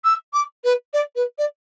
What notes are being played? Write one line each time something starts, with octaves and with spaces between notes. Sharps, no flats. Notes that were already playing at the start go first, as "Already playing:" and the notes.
E6
D6
B4
D5
B4
D5